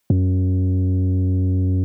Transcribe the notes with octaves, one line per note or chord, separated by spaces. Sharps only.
F#2